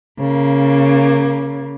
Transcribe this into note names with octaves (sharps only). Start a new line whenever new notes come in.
C#3 A#3